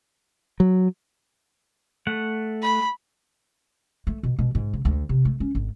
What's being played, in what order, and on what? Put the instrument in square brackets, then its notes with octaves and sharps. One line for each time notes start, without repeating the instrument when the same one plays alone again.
[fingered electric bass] F#3
[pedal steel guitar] A3 F#5
[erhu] B5
[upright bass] A3
B2
B2
G#2
C#3
D2
C3
A3
C#4
G#1